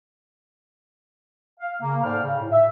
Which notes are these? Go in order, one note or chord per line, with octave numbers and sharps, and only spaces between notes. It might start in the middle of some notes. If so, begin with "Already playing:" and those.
F5
C#3 A#3
G#2 A4 C5 D5 G5 F6
C#3
A2
E5